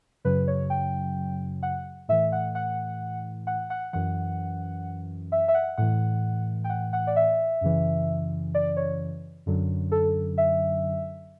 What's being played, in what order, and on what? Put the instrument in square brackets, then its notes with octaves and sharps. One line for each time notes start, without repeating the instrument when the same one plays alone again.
[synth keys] F#2 C#3 F#3 B4
C#5
G5
F#5
A2 E3 E5
F#5
F#5
F#5
F#5
F#2 E3 F#5
E5
E5
F#5
A2 E3 F#5
G5
F#5
F#5
D5
E5
F#2 C#3 E3
D5
C#5
F#2 D3 F#3
A4
E5